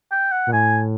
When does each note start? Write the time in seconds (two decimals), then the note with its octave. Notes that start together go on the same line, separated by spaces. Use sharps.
0.11 G5
0.32 F#5
0.47 A#2
0.53 A2 G#5